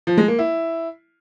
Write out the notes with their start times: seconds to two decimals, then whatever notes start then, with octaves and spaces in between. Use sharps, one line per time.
0.07 F3
0.18 G#3
0.28 A#3
0.39 E4